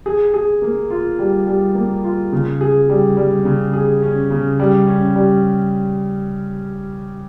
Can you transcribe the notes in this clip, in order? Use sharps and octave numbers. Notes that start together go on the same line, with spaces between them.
G#4
G#4
A#3
F4
G3
G3
A#3
F4
C#3
G#4
G3
G3
C#3
G#4
C#4
C#3
G3
C#4
G3